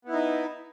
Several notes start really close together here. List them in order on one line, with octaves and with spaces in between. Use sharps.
B3 E4 D#4